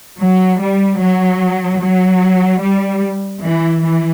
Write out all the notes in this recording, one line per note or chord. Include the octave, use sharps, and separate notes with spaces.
F#3
G3
F#3
F#3
G3
E3
E3